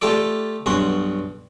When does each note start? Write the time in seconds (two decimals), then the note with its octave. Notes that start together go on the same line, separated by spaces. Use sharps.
0.02 A3 F4 G4 A4 D5
0.66 B1 G2 F#4 C6